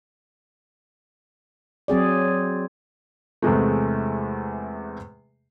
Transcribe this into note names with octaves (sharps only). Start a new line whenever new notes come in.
F#3 C4 G#4 D5
E2 C3 G#3 A3